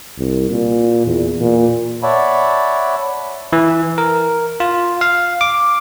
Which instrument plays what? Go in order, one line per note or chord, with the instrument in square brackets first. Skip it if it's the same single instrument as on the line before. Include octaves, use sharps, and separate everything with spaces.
[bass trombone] C2
A#2
E2
A#2
[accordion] C#5 D5 E5 F#5 A5 B5
[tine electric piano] E3
A#4
F4
F5
D6